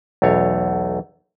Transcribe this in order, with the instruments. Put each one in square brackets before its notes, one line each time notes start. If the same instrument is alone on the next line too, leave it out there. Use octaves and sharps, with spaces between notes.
[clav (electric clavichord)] B1 E2 A3 C#5 F5